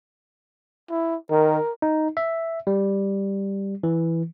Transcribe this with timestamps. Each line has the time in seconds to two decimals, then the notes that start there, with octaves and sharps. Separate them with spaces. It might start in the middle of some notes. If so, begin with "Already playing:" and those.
0.90 E4
1.30 D#3 A#4
1.82 D#4
2.17 E5
2.67 G3
3.83 E3